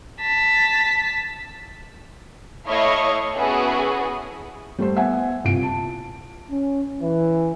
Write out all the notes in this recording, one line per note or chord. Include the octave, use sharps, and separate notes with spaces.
A5 B6
A3 E4 C#5 D#5 F5 C#6
B3 C#4 E4 F#4 G#4 A4
G3 A3 C5
B3 E5 F#5 G#5
C2 A#2 D7
A5
C#4
E3